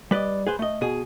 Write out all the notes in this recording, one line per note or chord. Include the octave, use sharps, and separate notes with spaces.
G3 B4 D5 D#5
G#4 B4 C5
A3 D#5
B2 G#4